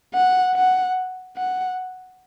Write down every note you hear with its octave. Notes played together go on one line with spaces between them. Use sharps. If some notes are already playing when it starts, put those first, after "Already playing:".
F#5
F#5
F#5